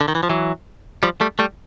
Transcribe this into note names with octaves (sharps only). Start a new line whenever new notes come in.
D3
D#3
E3
F3
E3 F#3
F3 G3
G3 A3
G3 A3